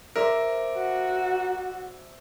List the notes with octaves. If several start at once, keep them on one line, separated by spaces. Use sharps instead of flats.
A#4 C5 D5 E5
F#4